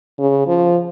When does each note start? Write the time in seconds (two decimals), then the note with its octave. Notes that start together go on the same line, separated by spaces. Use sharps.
0.19 C#3
0.47 F3